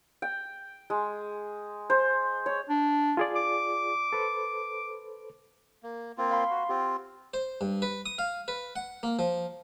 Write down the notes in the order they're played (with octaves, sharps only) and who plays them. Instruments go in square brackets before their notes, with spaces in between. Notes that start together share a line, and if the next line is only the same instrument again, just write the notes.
[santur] G5
G#3
C5
C#5
[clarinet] D4
[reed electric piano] F4 G#4 D5
[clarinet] D6
[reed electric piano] A4 B4 C5
[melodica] A#3
A#3 C4 F4
[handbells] F5 B5 C6
[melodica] F#4
[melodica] C4 F4 [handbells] G4 F#5 G5
[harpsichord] C5
G2
B4
D#6
F5
B4
F#5
A#3
F3